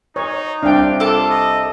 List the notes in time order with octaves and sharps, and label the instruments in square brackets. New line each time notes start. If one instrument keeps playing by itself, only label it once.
[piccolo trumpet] D#4 [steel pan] C#5
[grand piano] C2 C4 [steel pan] D4 G5 [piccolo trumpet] F5
[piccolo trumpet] F4 [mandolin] A4 D6
[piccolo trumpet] D#5